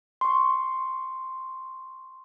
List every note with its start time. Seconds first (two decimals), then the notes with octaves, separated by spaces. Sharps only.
0.21 C6 C#6